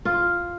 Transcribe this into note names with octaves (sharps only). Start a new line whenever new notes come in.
F4